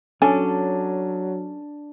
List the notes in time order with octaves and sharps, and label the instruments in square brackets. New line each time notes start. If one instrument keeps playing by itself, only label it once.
[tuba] F#3 [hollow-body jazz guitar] C#4 A4 [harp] D4 [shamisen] G#5